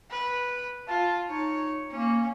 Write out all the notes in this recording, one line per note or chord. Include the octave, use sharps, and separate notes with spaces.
B4
F4 A5
D#4 C#5
A#3 C#4